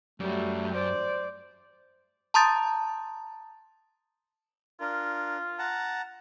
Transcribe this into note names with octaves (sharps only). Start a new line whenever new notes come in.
F#2 F#3 G3 A3
C5 D5
A5 A#5 C6 D#6 G6 A6
D4 F4 A#4
F#5 A5 A#5